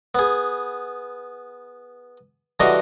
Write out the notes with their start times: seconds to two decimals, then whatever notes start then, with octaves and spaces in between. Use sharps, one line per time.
0.15 B3 G#4
2.60 D3 E3 G3 F#4 D#5 A#5